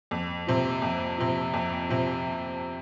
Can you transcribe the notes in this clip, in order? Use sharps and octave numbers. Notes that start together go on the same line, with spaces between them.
F2
C3 F3
F2
C3 F3
F2
C3 F3